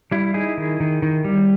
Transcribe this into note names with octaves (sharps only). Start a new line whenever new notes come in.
G3 E4
D#4 E4 G#4
D#3
D#3
D#3
G3